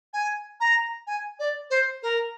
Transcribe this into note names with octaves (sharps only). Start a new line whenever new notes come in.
G#5
A#5
G#5
D5
C5
A#4